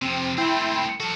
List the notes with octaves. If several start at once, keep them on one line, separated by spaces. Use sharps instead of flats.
C3 F3 C4
A3 C4 E4 G5 C6
F3 F#4 A4